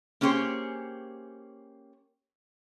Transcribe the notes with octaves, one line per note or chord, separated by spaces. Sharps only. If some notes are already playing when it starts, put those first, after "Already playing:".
A#3 C#4 G4 G#4 C5 C#5